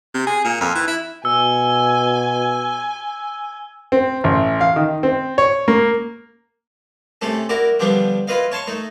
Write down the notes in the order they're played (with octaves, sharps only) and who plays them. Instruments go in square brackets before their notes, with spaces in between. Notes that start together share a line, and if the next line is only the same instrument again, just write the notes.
[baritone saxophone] C3
G#4
A#2
F2
E3
E4
[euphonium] B2 [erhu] G#5 [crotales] E6
[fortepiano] C4
A1
F5
D#3
C4
C#5
A#3
[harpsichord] C3 A3 C#4 A4
E4 F#4 A#4 D5
D3 F3 G3 B3 D4
E4 F4 B4 D#5 F5
C#5 A5 C6 C#6
A3 D#4